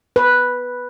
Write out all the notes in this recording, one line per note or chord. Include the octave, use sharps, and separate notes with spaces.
B4